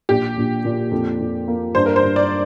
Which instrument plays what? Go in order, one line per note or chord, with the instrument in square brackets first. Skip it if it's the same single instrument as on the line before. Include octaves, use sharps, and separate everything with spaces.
[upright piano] A#1 [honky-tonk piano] G4
[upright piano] A#1
A#2
F2
F2
A#3
[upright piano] G2 [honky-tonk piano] C5
[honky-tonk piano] A#4
C5
[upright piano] G2
[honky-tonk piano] D5